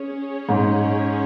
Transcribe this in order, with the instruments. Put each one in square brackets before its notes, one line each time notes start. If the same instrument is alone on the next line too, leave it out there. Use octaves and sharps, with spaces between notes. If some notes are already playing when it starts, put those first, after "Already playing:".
Already playing: [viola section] C#4 G#4 C#5
[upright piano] G#2